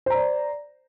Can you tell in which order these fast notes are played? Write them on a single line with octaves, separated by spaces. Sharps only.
C5 A#5 D5